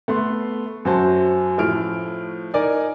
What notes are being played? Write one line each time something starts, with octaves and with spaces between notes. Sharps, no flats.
A3 B3 C6
F#2 F#4 C5 A5
A2 F3 A3 F6 D7
D#4 A#4 D5 D#5 G#5